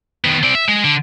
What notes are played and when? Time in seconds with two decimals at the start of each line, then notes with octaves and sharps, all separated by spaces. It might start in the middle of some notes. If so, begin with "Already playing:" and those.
0.24 D#3 B3
0.43 C4 D5
0.55 E5
0.68 G#3
0.84 D3